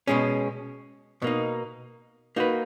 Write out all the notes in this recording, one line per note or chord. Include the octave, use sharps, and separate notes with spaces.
B2 G#3 C#4
B2 A#3 D#4
A#3 D#4 F#4 B4